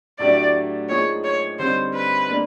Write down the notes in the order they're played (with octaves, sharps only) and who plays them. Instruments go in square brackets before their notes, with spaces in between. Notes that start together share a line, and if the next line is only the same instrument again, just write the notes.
[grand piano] A2 F#3 A3 D4 G4 [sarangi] D5
[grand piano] F3 A#3 D#4 G#4 [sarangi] C#5
[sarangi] C#5
[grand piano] D3 G3 C4 D#4 [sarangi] C5
[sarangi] B4
[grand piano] A#3 D4